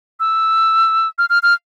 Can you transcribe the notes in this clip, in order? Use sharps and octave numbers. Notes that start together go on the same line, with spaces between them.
E6
F6
F6
F6